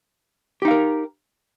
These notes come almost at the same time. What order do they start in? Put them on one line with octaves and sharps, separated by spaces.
G4 D#4 F5 A#4